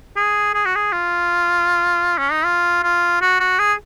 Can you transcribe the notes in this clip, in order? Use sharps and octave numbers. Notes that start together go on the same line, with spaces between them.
G#4
G#4
F#4
G#4
F4
C#4
D#4
F4
F4
F#4
F#4
G#4